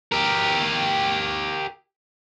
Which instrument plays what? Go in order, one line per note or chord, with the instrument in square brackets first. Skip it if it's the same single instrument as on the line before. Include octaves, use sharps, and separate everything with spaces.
[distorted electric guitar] G4 A#4